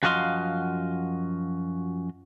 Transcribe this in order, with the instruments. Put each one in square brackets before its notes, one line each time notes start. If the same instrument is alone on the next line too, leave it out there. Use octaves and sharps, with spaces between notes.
[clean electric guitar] F#2 F3 F#4 D#5 F5 C6